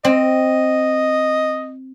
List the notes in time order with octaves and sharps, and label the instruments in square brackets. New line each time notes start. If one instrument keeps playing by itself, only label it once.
[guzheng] C4 [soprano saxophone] D#5